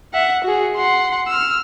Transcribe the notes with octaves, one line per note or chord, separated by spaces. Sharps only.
E5 F#5
F#4 G#4
F#5 C6
E6 F6